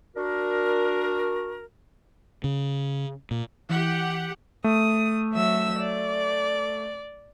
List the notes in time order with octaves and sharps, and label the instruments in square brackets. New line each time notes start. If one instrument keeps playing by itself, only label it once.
[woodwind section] D4 F#4 A#4
[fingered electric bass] C#3
A#2
[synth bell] E3 B6 G7 [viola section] G4 F#5
[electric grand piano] A3 [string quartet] D#6
[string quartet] F#3 E5 E6
D5